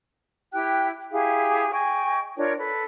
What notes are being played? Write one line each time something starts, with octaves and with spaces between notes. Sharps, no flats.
E4 G4 G5 F#6
E4 G4 G#4 F5
D#5 G5 G#5 C#6
D4 F4 A#4 C#5
A4 B4